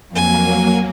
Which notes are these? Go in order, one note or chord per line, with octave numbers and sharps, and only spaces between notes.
F2 F#3 A#3 G#5